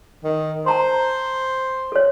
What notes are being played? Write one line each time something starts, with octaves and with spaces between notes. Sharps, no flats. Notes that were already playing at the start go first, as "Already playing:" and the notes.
D#3
C5 A5 A#5 C6
A4 C#5